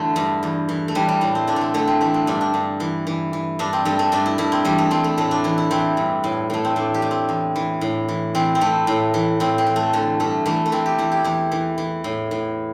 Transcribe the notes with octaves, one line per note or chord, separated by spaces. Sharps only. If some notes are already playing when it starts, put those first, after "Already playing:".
Already playing: E2 D3 A3
G2
E2
E3
A3
E3 G3
G3
A2 A3
C4
D3 D4
A3
C4
D3 A3
C4
E3 A3
C4
G2 D4
D4
G2
E3
E3
E3
G2 D4
C4
G2 A3
A3
G2 D4
E4
G2 E4
C4
E2 G3
A3
E2 C4
A3
A2 A3
D4
E3 E4
E4
E3 C4
G2
A2
A2 A3
C4
A2 D4
G4
A2
C4
E2
E3
A2
E3
E3 C4
C4
E3 A3
A2
E3
A2 C4
C4
E3
A3
D3 A3
G2 A3
E3 A3
A3
E3 C4
G4
E2 E4
G4
E2 E4
E3
E3
A2
A2